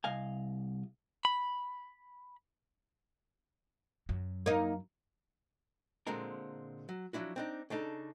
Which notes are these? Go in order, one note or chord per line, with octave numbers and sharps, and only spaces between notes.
C2 D#5 F5 G#5
B5
F#2 F#3
A#3 D#4
A#2 D3 G#3 C4 A#4 A#5
F#3
F3 F#3 D4 E4 F#4
C4 D4 D#4
C#3 D4 D#4 A4